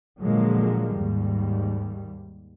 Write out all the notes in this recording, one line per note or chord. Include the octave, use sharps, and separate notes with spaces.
A#2 D3 F3 F#3 G#3 A#3
D#2 G#2 G3